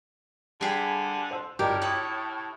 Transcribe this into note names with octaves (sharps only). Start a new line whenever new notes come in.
D3 G3 G4 G#4 B5
C5 C6 E6
G1 A2 G4 A#4 D5 D#5
E4 C#5 G5 D6 D#6